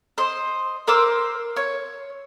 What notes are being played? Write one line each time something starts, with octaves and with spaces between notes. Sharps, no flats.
C5 D#5
A#4 C5 D6 E6
C#5